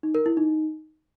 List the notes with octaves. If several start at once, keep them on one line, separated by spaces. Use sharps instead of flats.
D#4
A#4
E4
D#4